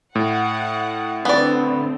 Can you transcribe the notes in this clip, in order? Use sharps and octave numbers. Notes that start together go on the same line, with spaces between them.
A2 F#5
D3 B3 C4 D5